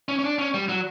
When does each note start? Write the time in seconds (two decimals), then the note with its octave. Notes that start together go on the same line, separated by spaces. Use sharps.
0.09 C#4
0.19 C#4
0.24 D4
0.39 C#4
0.54 G3
0.69 F#3